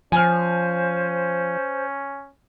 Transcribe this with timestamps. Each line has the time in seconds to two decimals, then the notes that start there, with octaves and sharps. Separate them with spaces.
0.12 F3 C#4 C5 G#5 F6